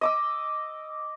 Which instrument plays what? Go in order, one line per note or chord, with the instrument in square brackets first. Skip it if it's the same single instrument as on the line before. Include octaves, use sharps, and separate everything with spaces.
[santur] D#5 D6 E6